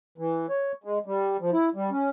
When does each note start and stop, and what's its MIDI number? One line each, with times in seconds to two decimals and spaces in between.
0.18 0.46 52
0.49 0.72 73
0.84 0.99 56
1.06 1.37 55
1.41 1.51 53
1.52 1.69 64
1.75 1.90 55
1.91 2.10 61